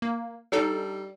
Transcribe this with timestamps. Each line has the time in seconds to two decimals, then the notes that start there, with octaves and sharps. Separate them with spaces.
0.02 A#3
0.52 G3 D4 D#4 A4